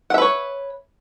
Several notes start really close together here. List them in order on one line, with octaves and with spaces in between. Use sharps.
F#5 E5 B4 C#5